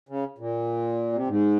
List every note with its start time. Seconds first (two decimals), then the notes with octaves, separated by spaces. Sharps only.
0.09 C#3
0.38 A#2
1.13 C3
1.28 G#2